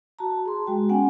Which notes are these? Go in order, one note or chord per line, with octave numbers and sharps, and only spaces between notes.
F#4 A5 A#5
G#4 C6
G#3 F#4 G5
B3 C#4 F#5 G#5